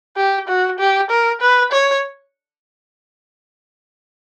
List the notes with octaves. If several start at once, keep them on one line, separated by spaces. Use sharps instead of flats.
G4
F#4
G4
A#4
B4
C#5